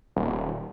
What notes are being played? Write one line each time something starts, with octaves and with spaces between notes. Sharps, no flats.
D#1